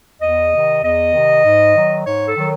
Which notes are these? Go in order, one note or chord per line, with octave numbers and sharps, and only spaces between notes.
E2 D#5
C3 D#3
E2 D#5
C3 D#3
G#2
D#3 F#3
G#2 C#5
A4
D#3 F#3